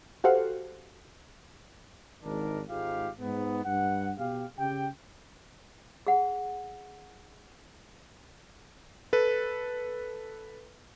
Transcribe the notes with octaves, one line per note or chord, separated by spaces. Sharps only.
F#4 G4 A4 C5 F5 F#5
G#1 G#2 D#3 D4 A#4
G#1 G#2 F4 G4 F5
G#2 B3
G2 F#5
B2 G4 F5
C#3 G4 G5
G#4 F#5
A4 B4